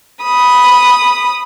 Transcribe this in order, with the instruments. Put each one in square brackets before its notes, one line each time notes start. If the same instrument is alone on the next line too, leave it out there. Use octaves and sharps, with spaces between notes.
[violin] B5 D#6